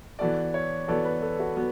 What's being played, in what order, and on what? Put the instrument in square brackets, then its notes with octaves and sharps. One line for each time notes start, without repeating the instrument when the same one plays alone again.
[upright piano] E3 B3 F#4 A4 [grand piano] D5
[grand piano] C#5
[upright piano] E3 B3 F#4 A4 [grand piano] D5
[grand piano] B4
A4
F#4
[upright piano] F#3 B3